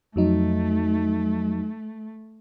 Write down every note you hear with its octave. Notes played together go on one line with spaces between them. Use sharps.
F2 F#3 A3 D#4